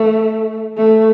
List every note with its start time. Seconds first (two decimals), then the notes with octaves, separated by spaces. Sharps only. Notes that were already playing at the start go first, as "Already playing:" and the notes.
Already playing: A3
0.77 A3